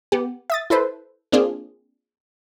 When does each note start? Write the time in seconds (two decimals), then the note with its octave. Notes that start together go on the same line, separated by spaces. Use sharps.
0.12 B3 G4
0.50 E5 D#6 A6
0.70 E4 A4 B4 C5
1.32 A#3 C4 D4 F4 G#4